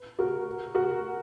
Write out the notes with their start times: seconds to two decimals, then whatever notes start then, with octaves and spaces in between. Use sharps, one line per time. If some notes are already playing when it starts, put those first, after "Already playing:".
Already playing: B4
0.19 F#4 A#4
0.74 F#4 A#4